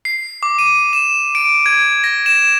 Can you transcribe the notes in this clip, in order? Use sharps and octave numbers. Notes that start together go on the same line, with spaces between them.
C7
D6
D#7
E7
D7
G#6
A#6
E7